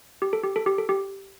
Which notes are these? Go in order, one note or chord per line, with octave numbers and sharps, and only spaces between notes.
G4
A4
G4
A4
G4
A4
G4